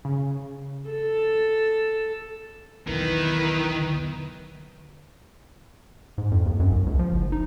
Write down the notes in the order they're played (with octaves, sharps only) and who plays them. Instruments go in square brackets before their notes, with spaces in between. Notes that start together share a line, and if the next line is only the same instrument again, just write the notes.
[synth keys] C#3
[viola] A4
[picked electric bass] B1 E2 [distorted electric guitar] D#3 [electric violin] E4 B4
[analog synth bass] G#2
F2
D#2
F#2
B1
C#2
F3
F#1
D#4